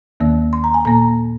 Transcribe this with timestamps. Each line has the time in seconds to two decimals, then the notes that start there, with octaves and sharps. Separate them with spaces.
0.20 D#2 D#3 A#3
0.53 C6
0.64 A#5
0.74 G#5
0.85 A#2 A#3 A#5